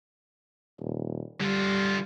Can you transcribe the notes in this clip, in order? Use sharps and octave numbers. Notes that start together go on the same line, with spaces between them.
D#1
D3 G3 F4